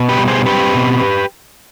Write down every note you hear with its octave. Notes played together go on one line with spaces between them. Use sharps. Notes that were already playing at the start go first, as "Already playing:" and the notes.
Already playing: B2
G4 B4
G3
G#4 C5
C4 G4 B4
B2